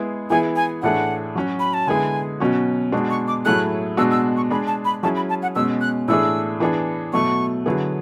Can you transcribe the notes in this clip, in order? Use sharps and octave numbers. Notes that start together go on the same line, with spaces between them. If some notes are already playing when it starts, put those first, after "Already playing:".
Already playing: G#3 B3 E4 G#4
E3 B3 E4 G#4 G#5
G#5
A2 E3 A3 D4 G#4 F#5
F#3 C#4 F#4
B5
A5
D3 G#3 B3 E4 G#4 G#5
B2 F#3 C#4 F#4
B2 G#3 D4 F#4
C#6
D6
A2 F#3 A3 E4 G#4 F#6
B2 G#3 D4 F#4 E6
E6
C#6
G#3 D4 G#4 B5
A5
B5
F#3 C#4 E4 G#4 A5
B5
A5
F#5
B2 G#3 C#4 E6
F#6
A2 E3 A3 D4 G#4 E6
E3 B3 D4 G#4
B2 F#3 A3 C#6
D3 F#3 B3 E4 G#4